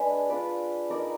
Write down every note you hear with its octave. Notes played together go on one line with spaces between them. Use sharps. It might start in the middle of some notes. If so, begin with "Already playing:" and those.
Already playing: G#3 D4 G#4 B4
D4 F4 B4 D5
D#4 A#4 D5